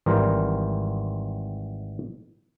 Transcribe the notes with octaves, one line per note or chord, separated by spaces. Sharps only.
G#1 E3 G3 A#4 C5 F5